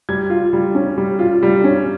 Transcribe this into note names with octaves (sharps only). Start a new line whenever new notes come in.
G3 G#6
F4
G3
C#4
G3
F4
G3
C#4